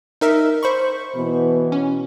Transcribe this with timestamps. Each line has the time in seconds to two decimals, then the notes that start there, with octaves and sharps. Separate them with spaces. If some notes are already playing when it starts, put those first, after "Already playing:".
0.21 D#4 A#4 E5
0.63 C5 B5 C#6
1.16 B2 E3 B3
1.72 C#4